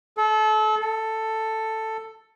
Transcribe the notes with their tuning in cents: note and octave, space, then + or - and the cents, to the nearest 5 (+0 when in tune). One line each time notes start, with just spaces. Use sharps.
A4 -30
A4 +5